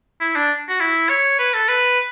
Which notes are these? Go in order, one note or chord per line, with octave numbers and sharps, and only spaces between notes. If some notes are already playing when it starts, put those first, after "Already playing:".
E4
D4
F#4
E4
C#5
B4
A4
B4